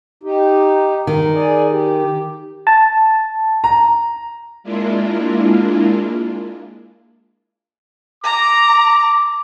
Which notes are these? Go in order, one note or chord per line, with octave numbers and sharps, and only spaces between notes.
D#4 G4
D#3
G#4 D5 G#5
G4
A5
A#5
G#3 A#3 D4 E4 F4
A#5 D6